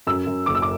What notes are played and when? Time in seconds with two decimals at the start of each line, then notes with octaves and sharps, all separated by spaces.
0.07 F#2 E6
0.27 F#2
0.46 F#1 D6
0.55 E6
0.62 D6